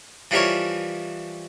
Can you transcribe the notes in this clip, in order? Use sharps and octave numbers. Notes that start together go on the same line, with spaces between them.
E3 F3 G3 A#4 C#5